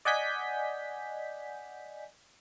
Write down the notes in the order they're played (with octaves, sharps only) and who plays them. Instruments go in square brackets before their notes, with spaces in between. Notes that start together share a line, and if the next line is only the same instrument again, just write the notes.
[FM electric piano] D5 D#5 F#5 G#5 G6 B6